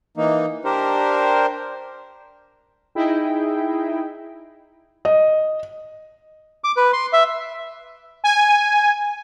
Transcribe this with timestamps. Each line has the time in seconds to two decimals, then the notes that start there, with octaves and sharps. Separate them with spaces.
0.17 E3 A#3 D#4
0.65 D4 G4 A#4 C5
2.95 D#4 E4 G#4 D#5 E5 G5
5.05 D#5
6.64 D6
6.77 B4
6.93 C6
7.13 E5
8.24 G#5